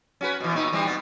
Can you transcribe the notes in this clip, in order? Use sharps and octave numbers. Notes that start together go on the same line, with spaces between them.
C#4 F#4 B4
B2 E3
A#2 D#4
E3 G3 C4
B2 B3